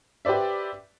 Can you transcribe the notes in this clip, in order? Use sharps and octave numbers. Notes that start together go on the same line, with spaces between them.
G4 B4 C5 D5 E5